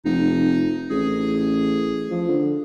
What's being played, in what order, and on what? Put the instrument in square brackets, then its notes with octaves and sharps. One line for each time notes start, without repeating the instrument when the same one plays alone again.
[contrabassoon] F1 [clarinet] D#4
[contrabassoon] A1 [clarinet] G#4
[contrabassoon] F3
D3